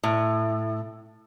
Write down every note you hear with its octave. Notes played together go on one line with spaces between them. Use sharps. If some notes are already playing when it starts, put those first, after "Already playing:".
A2